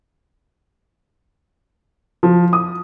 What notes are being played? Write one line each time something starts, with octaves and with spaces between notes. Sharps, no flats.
F3
D#6